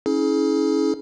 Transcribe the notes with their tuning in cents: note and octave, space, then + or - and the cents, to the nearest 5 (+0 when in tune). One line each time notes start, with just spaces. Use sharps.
C#4 +0 E4 -40 G#4 +30